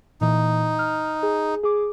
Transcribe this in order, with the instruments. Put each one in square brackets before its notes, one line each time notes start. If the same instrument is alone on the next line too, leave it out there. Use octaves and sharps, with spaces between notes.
[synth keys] A#2 E3 [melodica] D#4
[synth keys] F6
G#4
G#4 D6